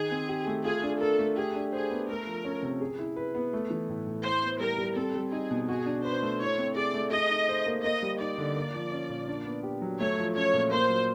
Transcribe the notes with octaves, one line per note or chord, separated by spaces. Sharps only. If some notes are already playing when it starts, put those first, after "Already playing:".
Already playing: D#3 D#4 G#4
C4
G4
A3
F4 G#4
D4
A4 A#4
A3
G4 G#4
D4
G#4 C5
B3
A3 A#4
F3
C#4
C3
G#4
E4
B4
B3
A3
E3
A2
A2
E4 C5
B3
G3 A#4
G3
C4 A4
G3
D#4 G#4
B2
F#4 G#4
D4
B4 C5
A3
E4 C#5
C4
G#4 D5
A3
G#4 D#5
D#4
C5
A#3
A#3 D#5
G3
D#4 D5
D3
A#3
F3
C#4
A#2
D4
B3
G4
F#3
A3 C#5
F3
C#4 C#5
A#2
A#3 C5
F#3